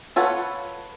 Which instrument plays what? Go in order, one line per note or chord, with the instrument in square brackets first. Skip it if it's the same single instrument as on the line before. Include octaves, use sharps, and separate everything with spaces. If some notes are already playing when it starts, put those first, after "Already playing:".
[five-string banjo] F4 A4 B4 C#5 F#5